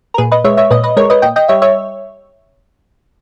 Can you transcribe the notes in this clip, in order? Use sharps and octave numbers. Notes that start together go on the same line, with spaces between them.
A#4
A#2 G#4 B4
B4 D#5
G#3 C#5 E5
C#5 E5
A#2 B4 D#5
B4 D#5
G#3 A#4 C#5
B4 D#5
A#2 D#5 G5
D#5 G5
G3 C#5 E5
C#5 E5